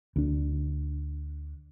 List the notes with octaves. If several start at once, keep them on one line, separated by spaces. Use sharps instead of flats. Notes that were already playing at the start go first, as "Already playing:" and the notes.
D2 D4